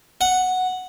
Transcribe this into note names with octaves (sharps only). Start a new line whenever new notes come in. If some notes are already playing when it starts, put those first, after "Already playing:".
F#5